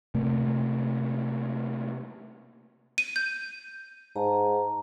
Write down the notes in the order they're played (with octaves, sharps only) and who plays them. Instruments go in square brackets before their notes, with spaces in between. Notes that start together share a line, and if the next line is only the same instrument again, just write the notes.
[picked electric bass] C3 A3 A#3
[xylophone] D#7
G6
[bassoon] G#2 [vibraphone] A5 A#5